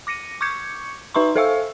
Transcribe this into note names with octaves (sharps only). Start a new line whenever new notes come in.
D6 A#6 C#7 D#7
C#6 D6 G6 G#6 C#7
D#4 B4 E5 A#5 C6 C#6
A4 C5 E5 F5 C#6 E6